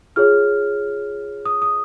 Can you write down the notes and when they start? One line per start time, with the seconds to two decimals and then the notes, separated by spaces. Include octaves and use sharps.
0.16 F4 G#4 C#5 F6
1.45 D#6
1.62 D#6